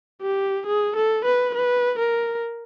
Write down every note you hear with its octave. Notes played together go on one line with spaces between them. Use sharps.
G4
G#4
A4
B4
B4
A#4